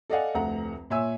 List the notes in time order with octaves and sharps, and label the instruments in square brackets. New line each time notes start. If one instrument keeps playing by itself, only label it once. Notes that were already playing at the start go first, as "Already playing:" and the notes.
[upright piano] A4 D5 D#5 F5 F#5 G#5
F1 D2 A4 F#5 A#5
A#2 C#5 E5 G#5 E6